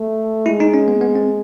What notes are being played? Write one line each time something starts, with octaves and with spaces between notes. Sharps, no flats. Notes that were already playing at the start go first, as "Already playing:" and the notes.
Already playing: A3
G#3 E4
D#4
C#4
B3
B3
C4